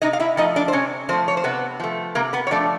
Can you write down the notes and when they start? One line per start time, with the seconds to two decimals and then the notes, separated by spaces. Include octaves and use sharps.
0.02 C3 D#4 D#5
0.13 F5
0.20 E4 E5
0.37 F3 A3 D#4 D#5
0.56 D4 D5
0.68 C5
0.73 C3 C#4 C#5
1.09 F3 A3 C4 C5
1.28 C#5
1.37 C5
1.44 C3 B3 B4
1.80 F3 A3
2.15 C3 A#3 A#4
2.33 B3 B4
2.47 C#5
2.51 F3 A3 D4 D5